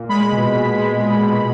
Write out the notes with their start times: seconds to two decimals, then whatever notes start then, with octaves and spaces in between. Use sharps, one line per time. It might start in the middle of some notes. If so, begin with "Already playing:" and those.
Already playing: A#2
0.09 G#3 B5
0.32 B2
0.54 B2
0.77 G#3
1.01 G#3
1.23 B2